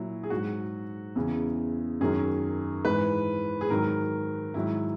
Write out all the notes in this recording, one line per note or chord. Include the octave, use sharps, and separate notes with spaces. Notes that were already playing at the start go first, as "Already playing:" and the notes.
Already playing: A#2 F#3 E4
G#4
G#2 F#3 F#4
E2 C#3 E3
F#2 D#3 F#3 G#4
G#2 E3 B4
G#4
G#2 D#3 F#3 A#4
G#2 D#3 F#3 E4